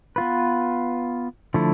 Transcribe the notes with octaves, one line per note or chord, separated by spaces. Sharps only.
B3 F4 B4
D3 F3 A3 E4 A4